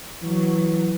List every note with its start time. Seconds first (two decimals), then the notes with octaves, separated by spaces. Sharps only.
0.22 E3 F#3